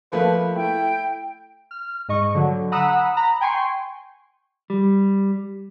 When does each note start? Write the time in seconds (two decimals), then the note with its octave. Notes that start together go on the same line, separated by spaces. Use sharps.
0.12 F3 A3 A#3 B4
0.55 A3 E4 G5
1.71 F6
2.08 G#2 D#5 C#6
2.34 D3 F#3
2.72 F#5 A#5 B5 D#6 E6 F#6
3.17 A#5 B5
3.41 G5 G#5 C6 C#6 C7
4.70 G3